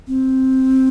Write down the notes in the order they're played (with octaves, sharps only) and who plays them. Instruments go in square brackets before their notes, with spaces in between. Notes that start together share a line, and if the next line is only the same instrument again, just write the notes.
[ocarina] C4